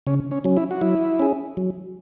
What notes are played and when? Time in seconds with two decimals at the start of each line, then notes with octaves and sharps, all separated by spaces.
0.07 C#3 C#4
0.31 C#4
0.44 F#3 C#4
0.57 E4
0.71 F#4
0.81 F#3 E4
1.19 C#4 G#4
1.57 F#3